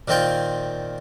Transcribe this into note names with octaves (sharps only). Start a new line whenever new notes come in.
A#2 D#3 C4 F4 G5